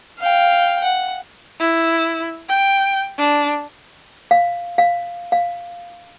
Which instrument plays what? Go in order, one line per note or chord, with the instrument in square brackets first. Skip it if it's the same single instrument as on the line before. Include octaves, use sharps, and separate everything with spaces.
[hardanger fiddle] F5 G5
F#5
[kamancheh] E4
G5
D4
[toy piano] F5
F5
F5